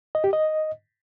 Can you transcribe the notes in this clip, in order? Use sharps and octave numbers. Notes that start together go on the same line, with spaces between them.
D#5
G4
D#5